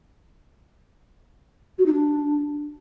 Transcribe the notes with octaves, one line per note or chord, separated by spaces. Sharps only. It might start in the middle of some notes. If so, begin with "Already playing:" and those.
F#4
D#4
D4